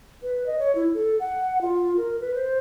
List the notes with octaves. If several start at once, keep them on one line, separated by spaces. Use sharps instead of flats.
B4
D#5
C#5
E4
A4
F#5
F4
A#4
B4
C5